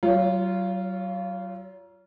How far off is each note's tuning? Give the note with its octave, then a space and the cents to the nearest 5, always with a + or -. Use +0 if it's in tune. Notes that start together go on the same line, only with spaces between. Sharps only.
F#3 +35 F4 -15 C#5 +0